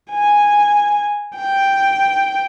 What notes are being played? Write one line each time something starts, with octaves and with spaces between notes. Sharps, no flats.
G#5
G5